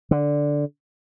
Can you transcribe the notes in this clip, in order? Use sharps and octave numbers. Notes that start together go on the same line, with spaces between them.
D3